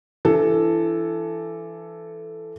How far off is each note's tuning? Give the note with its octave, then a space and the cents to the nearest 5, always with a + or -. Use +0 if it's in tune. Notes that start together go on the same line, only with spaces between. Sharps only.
E3 +25 D4 +0 A4 +0